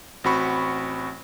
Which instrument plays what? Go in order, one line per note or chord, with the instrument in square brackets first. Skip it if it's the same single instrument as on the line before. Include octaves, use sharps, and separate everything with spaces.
[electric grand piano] A1 C4 F#4 B5 C#6